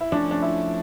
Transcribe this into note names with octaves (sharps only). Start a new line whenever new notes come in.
E4
F3 A3 C#4 D4
D4
E4